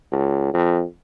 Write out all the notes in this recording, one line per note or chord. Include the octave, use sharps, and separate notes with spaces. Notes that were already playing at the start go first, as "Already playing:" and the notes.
C#2
F2